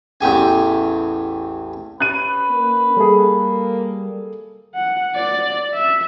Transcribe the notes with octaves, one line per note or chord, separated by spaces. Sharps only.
A1 E2 G4 G#5
C#4 B4 F#6 D#7
A#3
G3 G#4 A4
F#5
D5
E5